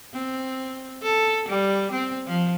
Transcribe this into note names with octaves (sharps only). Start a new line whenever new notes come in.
C4
A4
G3
C4
F3